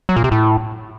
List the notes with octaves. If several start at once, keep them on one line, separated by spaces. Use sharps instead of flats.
F#3
A#2
C3
A2